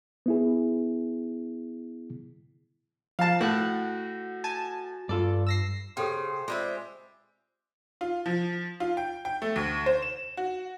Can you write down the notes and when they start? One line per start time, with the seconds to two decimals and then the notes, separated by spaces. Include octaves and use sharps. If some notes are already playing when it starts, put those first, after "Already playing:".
0.26 B3 E4 G#4
3.19 F3 F5 A5
3.41 A2 F#4 F#6
4.44 G#5 A5
5.09 G2 F4 A4 D5
5.47 E6 A#6 C7
5.97 C#3 G4 A4 C5 G5
6.48 G#3 C4 F4 D5 E5
8.01 F4
8.26 F3
8.80 F4
8.97 G5
9.25 G5
9.42 A3
9.56 D2
9.86 C5
10.02 E7
10.37 F#4